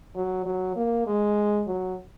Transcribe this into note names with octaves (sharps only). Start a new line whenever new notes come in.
F#3
F#3
A#3
G#3
F#3